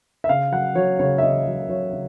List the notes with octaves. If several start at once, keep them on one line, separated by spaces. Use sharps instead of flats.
E5
C#3 F5
F#3 F#5
F#3 C#5
C#3 C#5
E5
C#3 D#5
F#3
F#3 C#5
C#3